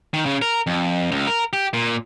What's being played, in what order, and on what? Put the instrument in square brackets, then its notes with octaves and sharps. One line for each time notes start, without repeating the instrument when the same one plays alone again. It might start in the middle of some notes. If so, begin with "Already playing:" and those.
[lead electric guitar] D#3
C#3
A#4
F2
C#2
A#4
G4
A#2